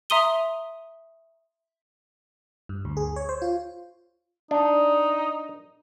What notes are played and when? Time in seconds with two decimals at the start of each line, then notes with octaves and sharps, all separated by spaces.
0.10 E5 A#5 C6 D#6 D#7 G7
2.69 G2
2.85 D2
2.97 G#4
3.16 C#5
3.29 C5
3.42 F4
4.51 D4 D#4